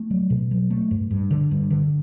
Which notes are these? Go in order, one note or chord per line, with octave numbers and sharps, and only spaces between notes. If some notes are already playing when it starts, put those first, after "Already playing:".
Already playing: A3
F#3
B2
F#3
A3
G2
G2
D3
G2
D3